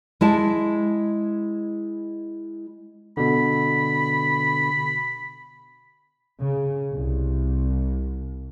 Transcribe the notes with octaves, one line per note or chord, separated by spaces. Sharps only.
G#3 E4 A5
B2 D3 B5
C#3
C2